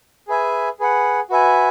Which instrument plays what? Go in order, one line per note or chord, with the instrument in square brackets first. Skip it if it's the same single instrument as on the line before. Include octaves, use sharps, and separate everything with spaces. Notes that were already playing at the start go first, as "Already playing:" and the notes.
[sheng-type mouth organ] G#4 B4 E5 G#5
G#4 B4 F#5
F#4 B4 E5 G#5